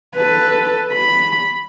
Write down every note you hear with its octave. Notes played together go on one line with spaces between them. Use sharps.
A4 B4
B5